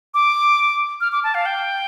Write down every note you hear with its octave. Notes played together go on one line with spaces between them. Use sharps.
D6
F6
D6
A5
F5
G5